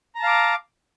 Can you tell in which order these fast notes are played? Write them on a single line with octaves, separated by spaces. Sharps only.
A#5 A5 F5 D6